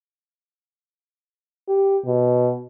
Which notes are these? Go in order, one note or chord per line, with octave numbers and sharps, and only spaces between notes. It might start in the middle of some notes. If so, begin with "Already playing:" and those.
G4
B2